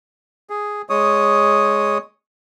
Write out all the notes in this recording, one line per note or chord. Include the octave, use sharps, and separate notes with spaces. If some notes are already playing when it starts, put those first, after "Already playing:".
G#4
G#3 C#5 D#6